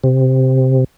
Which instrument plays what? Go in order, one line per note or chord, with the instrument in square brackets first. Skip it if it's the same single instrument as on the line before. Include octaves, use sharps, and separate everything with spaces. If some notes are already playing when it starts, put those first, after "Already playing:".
[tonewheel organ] C3